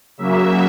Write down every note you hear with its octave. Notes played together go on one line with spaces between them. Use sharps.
C#3 F#3 A#3 E5